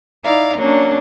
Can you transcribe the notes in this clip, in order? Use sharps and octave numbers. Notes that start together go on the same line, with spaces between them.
D#4 E4 D5 F5 A#5
F#3 A#3 C#4 D4